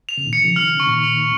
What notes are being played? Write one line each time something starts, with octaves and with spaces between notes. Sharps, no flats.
F7
C#3
A#2 D#3
C#7
C#3 F3
F6
D#3
C#3 C#6
A#2 D#3
F7